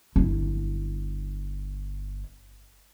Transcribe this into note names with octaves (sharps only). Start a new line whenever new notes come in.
G1 E4